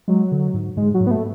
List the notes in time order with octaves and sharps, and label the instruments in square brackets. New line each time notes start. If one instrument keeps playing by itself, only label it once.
[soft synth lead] F#3 [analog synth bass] G#3
[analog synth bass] D3
G#2
[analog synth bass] G#2 [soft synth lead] G#3
[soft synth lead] F#3
[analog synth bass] G#2
[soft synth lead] B3
A3